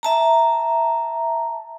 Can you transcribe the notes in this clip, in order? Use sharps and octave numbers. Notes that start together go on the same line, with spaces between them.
E5 A5 A#5